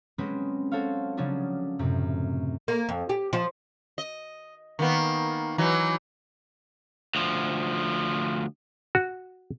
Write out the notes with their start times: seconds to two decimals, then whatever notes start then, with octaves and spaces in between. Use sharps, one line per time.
0.18 F#3 G#3 C4 C#4 F#4 B4
0.72 F#4 A4 C5 C#5 F5
1.17 C#3 F3 F#3 C#4 D4 F#4
1.79 F#2 A2 C3
2.68 A#3
2.89 F2
3.09 G4
3.33 F3
3.98 D#5
4.79 D#3 A#3 B3
5.58 E3 F#3 D#4
7.15 D2 F3
8.95 F#4